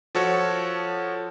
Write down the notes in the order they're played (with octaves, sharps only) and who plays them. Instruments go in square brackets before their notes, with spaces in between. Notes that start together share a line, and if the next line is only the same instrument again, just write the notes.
[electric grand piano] F3 F#4 A4 C#5